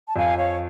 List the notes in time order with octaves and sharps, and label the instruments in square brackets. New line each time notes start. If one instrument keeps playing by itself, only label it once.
[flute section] A5
[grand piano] F2 [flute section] F5 G#5
[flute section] C#5 F5